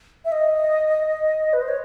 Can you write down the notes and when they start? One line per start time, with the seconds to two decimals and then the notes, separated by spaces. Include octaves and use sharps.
0.25 E5
0.32 D#5
1.53 B4
1.62 C5
1.68 C#5